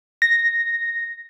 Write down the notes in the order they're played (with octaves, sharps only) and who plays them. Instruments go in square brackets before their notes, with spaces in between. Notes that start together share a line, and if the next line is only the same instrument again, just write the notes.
[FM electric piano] A#6